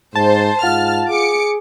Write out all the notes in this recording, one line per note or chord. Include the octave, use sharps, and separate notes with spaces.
G#2 C5 A5
G#2 F4 F5 F#5 F6
G#4 D6 C#7